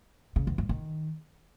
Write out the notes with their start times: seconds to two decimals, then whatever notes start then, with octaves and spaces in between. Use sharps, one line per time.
0.36 C#3
0.47 E2
0.58 G2
0.69 D#3